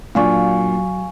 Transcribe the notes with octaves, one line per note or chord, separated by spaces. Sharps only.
A#2 F#3 D4 F4 F5 G#5 C#6